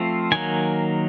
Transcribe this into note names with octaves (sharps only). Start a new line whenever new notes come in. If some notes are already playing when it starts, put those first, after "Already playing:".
Already playing: F3 A3 C4 F4
D#3 F#3 A#3 G#5